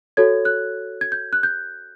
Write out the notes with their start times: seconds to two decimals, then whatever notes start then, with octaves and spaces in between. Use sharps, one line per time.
0.17 F#4 A4 C#5 G#6
0.45 F#6
1.01 G#6
1.12 G6
1.33 F#6
1.43 G6